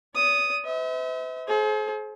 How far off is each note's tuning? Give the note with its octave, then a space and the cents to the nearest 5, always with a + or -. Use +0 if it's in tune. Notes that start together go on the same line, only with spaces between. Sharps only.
D5 -45 D#6 +0
C5 -45 E5 -40
G#4 +45 C5 +20